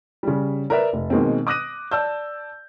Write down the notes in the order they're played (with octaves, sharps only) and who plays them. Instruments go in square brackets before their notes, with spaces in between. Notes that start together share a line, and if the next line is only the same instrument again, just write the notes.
[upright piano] C#3 G3
A#4 B4 D5 E5
F1
B2 D#3 G#3 A#3 C4
D6 D#6 F#6 A#6 D#7
D5 A5 E6 G6